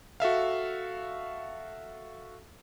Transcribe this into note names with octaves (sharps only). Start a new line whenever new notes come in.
F#4 A4 E5 F5